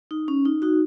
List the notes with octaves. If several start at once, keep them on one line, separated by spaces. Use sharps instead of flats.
D#4
C#4
D#4
D#4 F#4